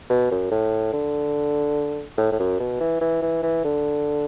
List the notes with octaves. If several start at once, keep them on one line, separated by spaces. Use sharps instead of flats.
B2
F#2
A2
D3
A2
A2
F#2
B2
E3
E3
E3
E3
D3